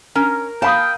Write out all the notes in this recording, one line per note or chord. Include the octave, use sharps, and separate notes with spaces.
C#4 A#4
F5 G5 A5 B5 D#6